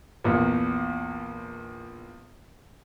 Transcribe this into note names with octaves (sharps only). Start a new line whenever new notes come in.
A#1 E2 A#2